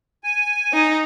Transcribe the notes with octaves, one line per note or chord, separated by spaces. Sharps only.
G#5
D#4